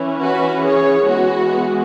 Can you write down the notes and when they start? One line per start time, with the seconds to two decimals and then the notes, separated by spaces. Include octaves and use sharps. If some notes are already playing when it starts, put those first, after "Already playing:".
Already playing: E3 C#4
0.21 F#4 B4
0.65 G#4 C#5
1.08 E3 G#3 B3 F#4